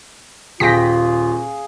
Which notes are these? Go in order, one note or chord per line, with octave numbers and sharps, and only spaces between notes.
D#1 F4 G#4 F5 G5 A#6 B6